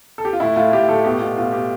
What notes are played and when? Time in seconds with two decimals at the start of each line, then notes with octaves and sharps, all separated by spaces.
0.18 A4
0.25 G4
0.33 F4
0.40 A2 E4
0.56 A2 F4
0.72 A2 G4
0.89 A2 A4
1.05 B2 G4
1.21 B2 F4
1.37 B2 F4
1.53 B2 G4